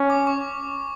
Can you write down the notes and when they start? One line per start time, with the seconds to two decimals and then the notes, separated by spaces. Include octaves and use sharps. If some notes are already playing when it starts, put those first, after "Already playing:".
Already playing: C#4
0.10 D6
0.27 C#6